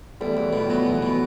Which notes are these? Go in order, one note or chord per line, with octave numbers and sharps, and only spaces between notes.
E2 G3 A3
E2 F#3 G#3
B2 F3 G3
E3 F#3 B3
E2
B2